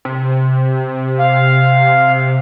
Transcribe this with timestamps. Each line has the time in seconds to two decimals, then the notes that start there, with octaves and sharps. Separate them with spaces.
0.05 C3
1.19 F5